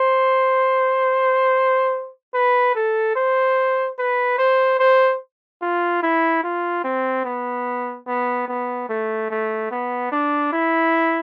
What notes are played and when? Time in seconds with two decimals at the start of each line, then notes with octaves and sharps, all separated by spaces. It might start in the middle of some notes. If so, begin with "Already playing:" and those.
Already playing: C5
2.34 B4
2.75 A4
3.16 C5
3.98 B4
4.38 C5
4.79 C5
5.62 F4
6.03 E4
6.43 F4
6.84 C4
7.25 B3
8.07 B3
8.48 B3
8.89 A3
9.31 A3
9.71 B3
10.12 D4
10.53 E4